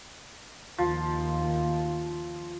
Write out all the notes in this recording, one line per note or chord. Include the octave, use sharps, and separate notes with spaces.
D#2 F3